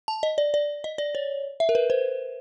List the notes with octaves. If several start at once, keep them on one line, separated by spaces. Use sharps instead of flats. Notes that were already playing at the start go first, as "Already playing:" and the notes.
A5
D#5
D5
D5
D#5
D5
C#5
E5
A#4
B4
C5